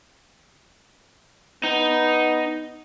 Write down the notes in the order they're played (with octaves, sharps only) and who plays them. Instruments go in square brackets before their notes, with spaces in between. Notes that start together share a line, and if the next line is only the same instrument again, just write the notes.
[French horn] B3 [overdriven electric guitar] D#4